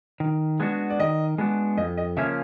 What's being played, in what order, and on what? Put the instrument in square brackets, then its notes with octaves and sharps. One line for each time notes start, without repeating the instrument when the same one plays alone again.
[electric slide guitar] D#3
G#3 B3 D4 F#4
[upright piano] D5
[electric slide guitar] D#3 [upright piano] D#5
[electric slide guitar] G#3 B3 D4 F#4
[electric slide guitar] F2 [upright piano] D#5
[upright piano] D#5
[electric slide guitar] C#3 F3 A#3 C#4 [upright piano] E5